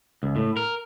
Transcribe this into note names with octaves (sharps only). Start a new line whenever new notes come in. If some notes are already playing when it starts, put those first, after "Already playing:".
C#2
A2
A#4